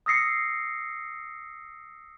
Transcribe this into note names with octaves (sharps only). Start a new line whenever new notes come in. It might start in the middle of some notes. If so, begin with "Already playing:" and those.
D#6 E6 A#6 C7 C#7